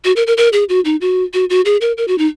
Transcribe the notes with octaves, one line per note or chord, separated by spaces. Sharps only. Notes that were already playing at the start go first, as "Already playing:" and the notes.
F#4
A#4
A#4
A#4
G#4
F#4
D#4
F#4
F#4
F#4
G#4
A#4
A#4
F#4
D#4